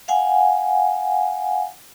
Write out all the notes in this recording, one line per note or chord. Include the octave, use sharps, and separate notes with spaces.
F5 F#5 G#5